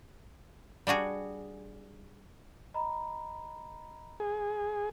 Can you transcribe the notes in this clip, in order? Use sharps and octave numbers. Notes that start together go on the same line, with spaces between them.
G3 D4 F#4 G#4
D#5 A#5 B5
G#4